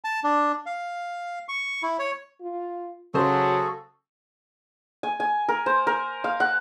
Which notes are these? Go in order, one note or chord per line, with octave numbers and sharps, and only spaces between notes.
A5
D4
F5
C#6
E4
C#5
F4
C#3 F#3 F#4 G#4 A4 C5
G#5
G#5
A#4
C5
A#4
F5
F#5